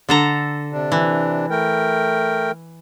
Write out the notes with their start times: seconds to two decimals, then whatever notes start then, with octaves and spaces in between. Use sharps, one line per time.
0.09 D3 A4 A#5
0.73 C3 D4
0.92 E3
1.50 A3 A#4 G5